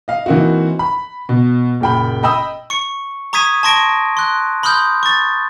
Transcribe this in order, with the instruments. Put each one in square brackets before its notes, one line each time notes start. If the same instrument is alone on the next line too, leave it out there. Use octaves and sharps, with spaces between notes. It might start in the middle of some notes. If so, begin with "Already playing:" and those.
[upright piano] D#5 F5
E3 A#3 C4 D#4 F#4
B5
B2
F#1 A#2 G5 B5
D#5 G5 B5 D#6 E6
[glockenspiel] C#6 C#7
A#5 C#6 D#6 G#6 B6 D#7
A5 C6 C#6 A#6 D7
C6 F#6
B5 C6 D#6 F6 G6
C#6 A6